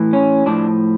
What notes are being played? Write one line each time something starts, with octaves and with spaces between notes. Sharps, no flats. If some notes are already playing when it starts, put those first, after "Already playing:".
Already playing: A2 E3
C#4
A2 F3 D4